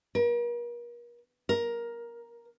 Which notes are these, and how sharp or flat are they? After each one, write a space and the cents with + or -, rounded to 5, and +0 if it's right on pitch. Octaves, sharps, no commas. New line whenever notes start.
A#4 +40
A#4 +10